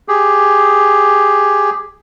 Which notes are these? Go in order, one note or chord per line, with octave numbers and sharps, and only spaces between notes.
G4 G#4